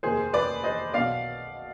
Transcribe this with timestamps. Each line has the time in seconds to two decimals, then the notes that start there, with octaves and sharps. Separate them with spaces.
0.03 F1 D#2 D#3 G#4 C5
0.33 B4 D5
0.64 C5 D#5
0.94 B1 B2 D5 F5